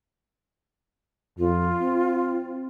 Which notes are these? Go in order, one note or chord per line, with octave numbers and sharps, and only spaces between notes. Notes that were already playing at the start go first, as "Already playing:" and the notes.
F2 F4
C4